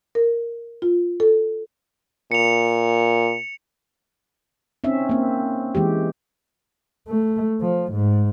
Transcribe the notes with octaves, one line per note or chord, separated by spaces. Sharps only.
A#4
F4
A4
A#2 C#7 F7
C4 C#4 D#4 E5
A#3 C4
E3 G#3 G4
A3
F3
G#2